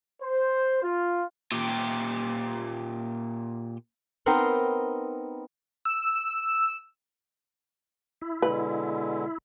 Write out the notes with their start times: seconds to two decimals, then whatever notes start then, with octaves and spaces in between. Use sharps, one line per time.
0.22 C5
0.83 F4
1.52 A#2 G4
4.26 B3 C4 D#4 A#4 G5 C6
5.85 E6
8.22 E4
8.42 B2 D3 G#3 B4